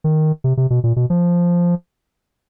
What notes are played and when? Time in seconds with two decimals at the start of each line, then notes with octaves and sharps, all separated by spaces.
0.04 D#3
0.44 C3
0.57 C3
0.70 B2
0.84 A#2
0.96 B2
1.10 F3